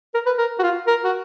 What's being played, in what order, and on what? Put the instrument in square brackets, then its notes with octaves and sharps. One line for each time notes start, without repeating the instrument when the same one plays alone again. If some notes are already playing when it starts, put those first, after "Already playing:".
[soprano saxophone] A#4
B4
A#4
F#4
F4
A#4
F#4